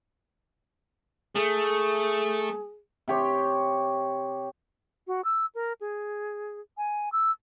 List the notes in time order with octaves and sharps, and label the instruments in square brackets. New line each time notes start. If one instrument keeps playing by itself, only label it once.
[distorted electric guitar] A3 [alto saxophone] G#4
[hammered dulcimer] C3 G4 C#5
[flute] F#4
E6
A#4
G#4
G#5
E6